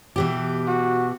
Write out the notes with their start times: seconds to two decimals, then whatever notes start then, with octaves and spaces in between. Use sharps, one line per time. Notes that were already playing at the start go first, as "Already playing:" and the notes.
0.16 B2 E3 G4
0.68 F#4